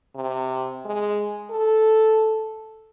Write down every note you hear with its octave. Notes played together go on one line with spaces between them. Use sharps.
C3
G#3
A4